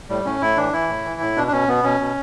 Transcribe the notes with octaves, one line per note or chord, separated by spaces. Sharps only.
A2 G3
A2 C#4
A2 E4
E3 D4
E3 E4
A2
E3
A2
B2 D4
D4
B2 C#4
B2 B3
B2 C#4
B2